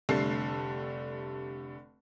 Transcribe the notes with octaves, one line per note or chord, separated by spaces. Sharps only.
F1 D3 G3 A3 A4 C7